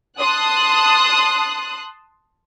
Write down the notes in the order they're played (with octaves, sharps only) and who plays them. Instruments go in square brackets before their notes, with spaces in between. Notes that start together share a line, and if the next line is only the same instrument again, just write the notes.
[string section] A5 C6 D#6 F#6